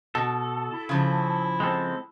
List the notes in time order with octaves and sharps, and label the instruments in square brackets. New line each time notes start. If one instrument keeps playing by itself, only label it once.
[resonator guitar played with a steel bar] B2 [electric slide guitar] A4
[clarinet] E4
[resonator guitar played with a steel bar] C#3 F3
[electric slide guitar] G#3 C4 A4